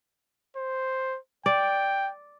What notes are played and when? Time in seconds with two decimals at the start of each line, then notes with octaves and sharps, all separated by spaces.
0.57 C5
1.46 D5 G5